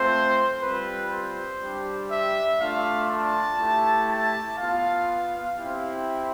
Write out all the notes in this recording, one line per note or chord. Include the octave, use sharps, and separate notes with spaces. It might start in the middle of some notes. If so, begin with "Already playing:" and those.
Already playing: A3 C4 F4 C5
G3 C4 F4 B4
C5
G3 D4 G4
E5
A3 D4 F4 F5
A5
A3 E4 G4
A5
B3 F4 F5
C4 E4 G4